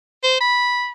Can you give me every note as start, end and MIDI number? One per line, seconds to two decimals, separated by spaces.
0.24 0.40 72
0.41 0.91 83